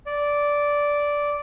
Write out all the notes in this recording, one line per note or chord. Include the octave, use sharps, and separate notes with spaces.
D5